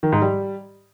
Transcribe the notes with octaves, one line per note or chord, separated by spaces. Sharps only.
D#3
G#2
G3